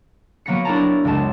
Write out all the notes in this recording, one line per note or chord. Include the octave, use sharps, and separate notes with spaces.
F#3 A#3 B3 A#6 B6 C#7
D4 E4 A#4 C#5 A5 A#5
F#1 C#2 F#3 G#3 A5